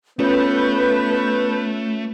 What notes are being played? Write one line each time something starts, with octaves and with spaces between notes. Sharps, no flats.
A3 B3 C#4 F4 B4 C#5 G6